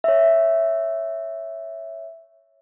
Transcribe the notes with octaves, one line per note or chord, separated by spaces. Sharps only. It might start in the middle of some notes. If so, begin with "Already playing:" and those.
C#5 E5